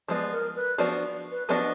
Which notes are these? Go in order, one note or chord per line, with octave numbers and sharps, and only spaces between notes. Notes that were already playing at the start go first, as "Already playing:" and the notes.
F3 G#3 B3 D5
A#4
B4
F3 B3 D4 F#4 D5
B4
F3 B3 D4 F#4 D5 D#5